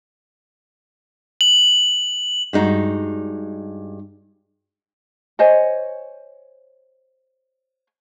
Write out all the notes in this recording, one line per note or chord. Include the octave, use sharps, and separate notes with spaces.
F#7
G2 G#3 D#4 F#4
C5 C#5 D#5 G#5